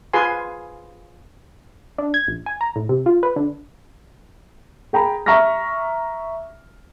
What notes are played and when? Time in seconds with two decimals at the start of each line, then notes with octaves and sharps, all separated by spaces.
0.13 F4 G#4 B4 G#5 C6
1.98 D4
2.14 G#6
2.28 A#1
2.46 G#5
2.61 A#5
2.76 A2
2.89 C3
3.06 F4
3.23 B4
3.36 D3
4.93 G#4 G5 A#5 B5
5.26 E5 A#5 C#6 F6 A#6